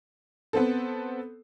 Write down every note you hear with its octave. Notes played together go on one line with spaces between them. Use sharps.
B3 C4 A4